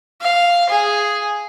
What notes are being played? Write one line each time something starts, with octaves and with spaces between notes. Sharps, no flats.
F5
G#4